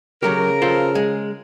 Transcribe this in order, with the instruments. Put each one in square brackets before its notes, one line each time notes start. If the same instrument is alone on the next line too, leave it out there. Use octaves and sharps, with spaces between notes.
[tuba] C#3 [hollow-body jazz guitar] F#3 A3 G4 [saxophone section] A#4
[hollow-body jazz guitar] F4 A4 C5
G#3